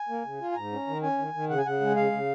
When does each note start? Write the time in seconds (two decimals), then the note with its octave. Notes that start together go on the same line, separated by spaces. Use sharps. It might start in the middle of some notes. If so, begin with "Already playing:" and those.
Already playing: G#5
0.09 A#3
0.25 C#3
0.41 F4
0.52 G#5
0.56 G#2 A#5
0.72 C#4
0.87 D#3
1.03 C#4 G#5
1.18 D#3
1.34 D#3
1.49 C#3 F#5
1.58 G#5
1.65 C#3 F#5
1.81 G#3
1.96 C#3 F5
2.12 C#3